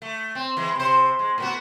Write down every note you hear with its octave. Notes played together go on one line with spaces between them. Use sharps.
A3
C4
E3 G#3
C3 C5
G#3
A2 B3 F#4